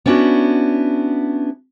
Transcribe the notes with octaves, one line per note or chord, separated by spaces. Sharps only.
B3 C#4 D4 E4 F#4